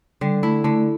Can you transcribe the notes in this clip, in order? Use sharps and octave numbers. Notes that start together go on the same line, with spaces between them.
D3 G3
A3 E4
D3 A3